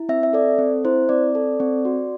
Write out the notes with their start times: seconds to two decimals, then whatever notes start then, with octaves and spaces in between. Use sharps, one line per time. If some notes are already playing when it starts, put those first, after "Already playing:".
Already playing: E4
0.09 C4 E5
0.23 E5
0.33 A4 D5
0.59 C4
0.85 E4 C5
1.09 C4 D5
1.35 A4
1.60 C4
1.85 F#4